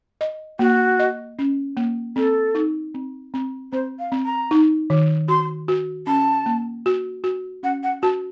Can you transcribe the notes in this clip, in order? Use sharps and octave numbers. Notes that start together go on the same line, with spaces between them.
D#5
A#3 F#4
D#5
C#4
A#3
C4 A4
D#4
C4
C4
C4 C5
F5
C4
A#5
D#4
D#3
F#4 C6
F#4
C#4 A5
A#3
F#4
F#4
C#4 F#5
F#5
F#4 A5